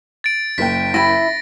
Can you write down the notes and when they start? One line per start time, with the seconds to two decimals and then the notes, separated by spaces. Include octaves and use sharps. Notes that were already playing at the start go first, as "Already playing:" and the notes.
0.24 A6 D7
0.58 F#1 A#3 G5 B6
0.94 E4 B5 A#6